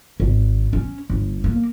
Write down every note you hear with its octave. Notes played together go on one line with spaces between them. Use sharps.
G#1
C#4
G1
A#3